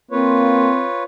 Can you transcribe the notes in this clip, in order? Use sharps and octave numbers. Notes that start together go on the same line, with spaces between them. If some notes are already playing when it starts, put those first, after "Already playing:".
A#3 C4 F4 B4 C#5